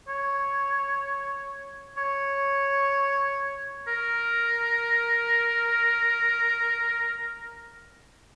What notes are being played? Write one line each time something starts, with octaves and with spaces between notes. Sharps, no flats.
C#5
C#5
A#4